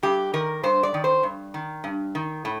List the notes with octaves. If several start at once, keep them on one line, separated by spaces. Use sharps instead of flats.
G2 G4
D#3 A#4
G2 C5
D5
D#3
C5
G2
D#3
G2
D#3
A2